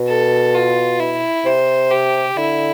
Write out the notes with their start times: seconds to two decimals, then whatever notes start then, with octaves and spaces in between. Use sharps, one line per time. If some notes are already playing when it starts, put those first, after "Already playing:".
Already playing: B2
0.08 A4
0.55 F4
1.00 E4
1.45 C3 C5
1.91 G4
2.37 D3 E4